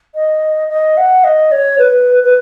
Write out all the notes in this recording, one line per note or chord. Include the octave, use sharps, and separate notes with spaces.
D#5
D#5
F#5
D#5
C#5
B4
B4